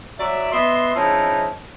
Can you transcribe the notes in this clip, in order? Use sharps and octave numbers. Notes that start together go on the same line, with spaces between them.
F#3 D5 E5
B3 B4 D#5 E5 C6
F3 G#3 C4 C#4 D#4 E4